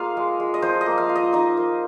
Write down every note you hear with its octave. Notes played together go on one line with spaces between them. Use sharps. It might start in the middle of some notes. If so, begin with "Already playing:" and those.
Already playing: A#3 F4 G#4 D#5 F5
G#3
G#3
D#5
F3 C5
D#5
A#3
F5
F4
D#5
D#4 D#5
A#3